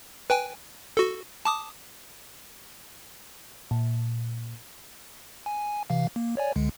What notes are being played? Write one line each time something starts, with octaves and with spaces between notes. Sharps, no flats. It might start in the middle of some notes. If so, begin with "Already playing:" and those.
B4 G5 G#5
F#4 A4
A5 D6 D#6
A#2
G#5
C3 E3 F5
A#3
C#5 D5 G#5
C#2 D3 G#3